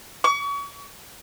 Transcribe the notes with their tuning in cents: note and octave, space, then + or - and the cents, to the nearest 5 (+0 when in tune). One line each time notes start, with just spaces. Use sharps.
C#6 +35